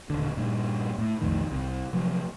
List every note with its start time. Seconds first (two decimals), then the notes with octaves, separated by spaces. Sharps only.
0.10 D#1 D3
0.37 G2 A#2
0.98 A2
1.21 B1 F2 A2 D#3
1.51 C2 C3
1.93 C3 F3 F#3